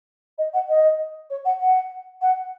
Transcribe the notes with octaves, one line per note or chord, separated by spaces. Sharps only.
D#5
F#5
D#5
C#5
F#5
F#5
F#5